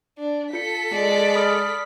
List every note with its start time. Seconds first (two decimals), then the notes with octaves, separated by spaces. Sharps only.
0.18 D4
0.53 F4 A4 B6 C#7
0.92 G#3 D5
1.35 B5 D#6 F6